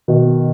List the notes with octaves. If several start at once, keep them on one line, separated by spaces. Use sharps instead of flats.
B2 D#3